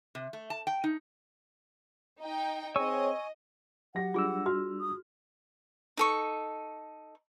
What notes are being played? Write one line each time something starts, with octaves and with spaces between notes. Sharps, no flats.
C3
A3
A5
G5
D#4
D#4 D#5 G5
C4 G#4 C#5 D#5 G#5 C#6 E6
F#3 G4 F#5 A#6
G3 D4 F4 G#4 E6
F#4 F6
D#6
D#4 A4 C#6